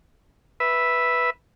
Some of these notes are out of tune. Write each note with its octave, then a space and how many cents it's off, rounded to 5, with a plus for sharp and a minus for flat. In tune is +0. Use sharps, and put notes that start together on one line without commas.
B4 +0 E5 +0